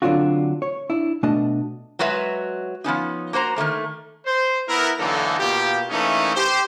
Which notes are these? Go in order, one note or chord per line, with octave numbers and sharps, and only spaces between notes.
D3 F#3 C4 D4 F4 F#4
C#5
D4 E4
B2 A3 D4 D#5 A5
F#3 G#3 F#4 B4 E5
F3 B3 C#4 D#4
A#3 F#4 C5 A#5
D#3 F3 A3 A#3
C5
B3 E4 A#4
D3 E3 F#3 A#3 D#4 A4
B2 A#3 F4 G4
E3 A3 A#3 C#4 D#4
G4 C5